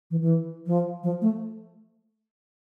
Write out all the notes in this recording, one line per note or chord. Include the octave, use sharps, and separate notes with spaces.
E3
E3
F3
F3
A3